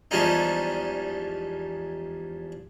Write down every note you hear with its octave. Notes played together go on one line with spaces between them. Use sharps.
E2 F3 G3 G#3 C#4 D#4